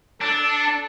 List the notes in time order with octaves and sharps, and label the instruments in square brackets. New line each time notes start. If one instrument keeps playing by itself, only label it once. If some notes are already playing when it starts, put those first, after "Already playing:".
[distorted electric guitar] D4 [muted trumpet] A4